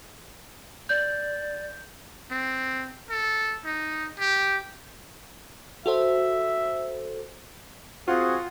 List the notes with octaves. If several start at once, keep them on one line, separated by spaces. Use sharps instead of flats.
D5 G6
C4
A4
D#4
G4
F#4 A4 C5 E5
C4 F4 F#4 G#4 F#5